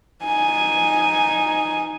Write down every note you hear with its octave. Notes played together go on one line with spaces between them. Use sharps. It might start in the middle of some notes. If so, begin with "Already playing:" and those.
D#4 G#5